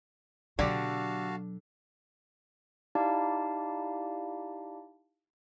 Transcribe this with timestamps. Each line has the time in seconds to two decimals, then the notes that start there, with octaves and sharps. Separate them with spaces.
0.59 B2 D3 F#3 F#4 G4 D5 F5 A5
2.95 D#4 E4 G4 D5 F5 A5